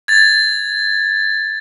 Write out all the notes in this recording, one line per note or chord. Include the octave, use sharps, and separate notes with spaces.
G#6 A6